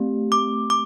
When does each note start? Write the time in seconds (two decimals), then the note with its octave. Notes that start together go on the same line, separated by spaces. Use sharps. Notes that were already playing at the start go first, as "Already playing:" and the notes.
Already playing: A3 C4 G4
0.32 D6
0.70 D6